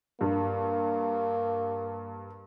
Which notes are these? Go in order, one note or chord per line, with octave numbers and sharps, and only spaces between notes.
G2 A#3